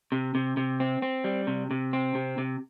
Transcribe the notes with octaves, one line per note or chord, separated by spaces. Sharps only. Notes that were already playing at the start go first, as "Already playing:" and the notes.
C3
C3
C3
C4
C4
G3
C3
C3
C4
C3
C3